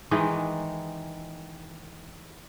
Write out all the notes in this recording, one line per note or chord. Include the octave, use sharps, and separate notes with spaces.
D#3 E3 G#3 D#4